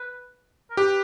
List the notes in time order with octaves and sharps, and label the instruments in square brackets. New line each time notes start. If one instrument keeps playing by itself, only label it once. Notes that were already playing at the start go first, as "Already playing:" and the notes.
Already playing: [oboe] B4
A#4
[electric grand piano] G4 [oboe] B4